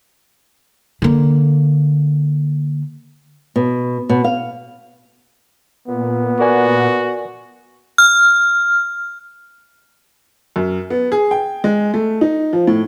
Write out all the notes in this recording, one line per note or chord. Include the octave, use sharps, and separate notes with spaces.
D3 A#3
B2
B2
F5
A#2 B3
F#4 A#4 D5 G#5
F6
F#2
B3
G#4
G5
G#3
A3
D#4
F3
A2